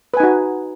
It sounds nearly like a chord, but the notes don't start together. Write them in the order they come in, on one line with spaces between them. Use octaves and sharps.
B4 G#5 D#4 F#4